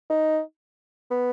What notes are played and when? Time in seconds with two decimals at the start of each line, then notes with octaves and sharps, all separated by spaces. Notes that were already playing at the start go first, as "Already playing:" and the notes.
0.10 D#4
1.11 B3